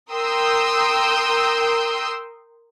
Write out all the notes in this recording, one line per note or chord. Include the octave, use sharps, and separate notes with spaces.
A#4 G5 C6 D#6 E6 G6